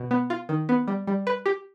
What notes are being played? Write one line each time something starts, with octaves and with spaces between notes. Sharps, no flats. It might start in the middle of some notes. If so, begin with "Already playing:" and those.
Already playing: B2
B3
F4
D#3
B3
G3
G3
B4
G4